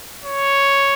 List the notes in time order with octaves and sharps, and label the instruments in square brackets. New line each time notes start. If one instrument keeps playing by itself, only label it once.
[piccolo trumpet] C#5